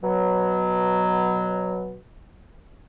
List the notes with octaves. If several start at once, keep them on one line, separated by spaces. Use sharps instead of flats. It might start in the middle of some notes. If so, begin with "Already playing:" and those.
B2 F#3